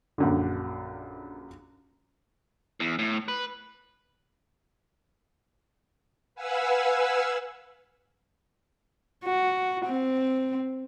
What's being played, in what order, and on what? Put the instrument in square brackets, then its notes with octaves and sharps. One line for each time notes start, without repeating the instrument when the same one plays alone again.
[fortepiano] A#1 F#2 D3
[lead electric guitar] E2
A2
B4
[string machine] B4 F5 F#5 G#5 E6
[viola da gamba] F#4
C4